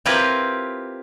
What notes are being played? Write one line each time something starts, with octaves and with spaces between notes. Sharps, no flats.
C4 E4 F4 G4 A#4 B4